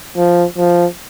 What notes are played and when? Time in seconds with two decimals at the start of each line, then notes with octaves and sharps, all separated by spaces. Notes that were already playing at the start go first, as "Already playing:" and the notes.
0.17 F3
0.58 F3